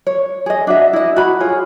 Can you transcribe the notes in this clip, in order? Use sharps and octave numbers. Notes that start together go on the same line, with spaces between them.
C#5
G#4 D#5
D4 F#4 E5
E4 D#5
F#4 B5
F4 G#4 C#5